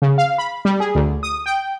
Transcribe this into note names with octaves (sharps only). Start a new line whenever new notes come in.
C#3
F5
B5
G3
G#4
D2
D#6
G5